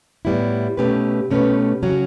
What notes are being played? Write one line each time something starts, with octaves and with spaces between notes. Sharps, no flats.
A2 G3 B3 E4
B2 A3 C#4 G4 B4
B2 A3 C#4 G4 B4
C#3 F#3 C#4 F#4